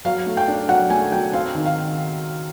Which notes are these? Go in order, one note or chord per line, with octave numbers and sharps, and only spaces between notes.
F#3 F5
A3
G5
D4
F#3 F#5
A3 G#5
F#3 G5
C4 F5
D#3
F5